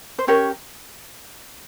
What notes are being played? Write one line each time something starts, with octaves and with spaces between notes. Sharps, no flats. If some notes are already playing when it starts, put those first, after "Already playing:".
C5
C#4 G4 A#4 C#5